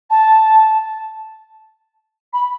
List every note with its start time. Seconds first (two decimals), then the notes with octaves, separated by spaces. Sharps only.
0.10 A5
2.33 B5